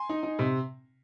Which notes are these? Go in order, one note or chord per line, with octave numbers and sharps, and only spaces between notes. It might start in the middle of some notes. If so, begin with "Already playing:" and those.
Already playing: G#5 C6
D#4
D#4
C3